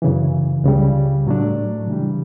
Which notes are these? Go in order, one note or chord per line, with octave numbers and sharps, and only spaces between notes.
F#2 C#3 E3
C#2 C#3 G3
A2 F#3 A3 D4
C#3 E3 G3